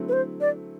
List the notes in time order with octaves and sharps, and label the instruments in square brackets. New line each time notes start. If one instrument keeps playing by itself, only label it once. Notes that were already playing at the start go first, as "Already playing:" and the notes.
Already playing: [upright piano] D3 F#3 A3 C4 E4
[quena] B4
C5
D5